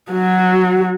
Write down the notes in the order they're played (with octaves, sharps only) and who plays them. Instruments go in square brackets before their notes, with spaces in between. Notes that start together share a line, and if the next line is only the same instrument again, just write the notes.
[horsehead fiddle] F#3 F#4